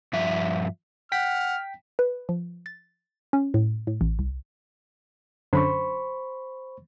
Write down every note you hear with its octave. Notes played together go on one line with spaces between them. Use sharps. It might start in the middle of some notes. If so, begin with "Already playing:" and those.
G2 F3 E5
F#5 G5 F6 B6
B4
F3
A6
C#4
A2
A2
A1
C2
F#2 D3 C5 B5 C#6